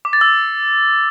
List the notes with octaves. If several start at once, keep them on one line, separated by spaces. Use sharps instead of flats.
D6
A6
E6